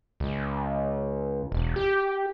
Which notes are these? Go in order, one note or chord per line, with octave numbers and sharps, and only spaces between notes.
C#2
E1
G4